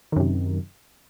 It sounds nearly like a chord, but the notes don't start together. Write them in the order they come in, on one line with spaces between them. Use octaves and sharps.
D#3 F#2 C3